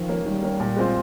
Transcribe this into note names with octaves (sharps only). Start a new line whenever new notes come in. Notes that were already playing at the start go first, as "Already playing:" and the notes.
Already playing: D#3 F3
A#3 C#4
D#3 G3
A#3 C#4
A#2
G#3 C4 F4 C5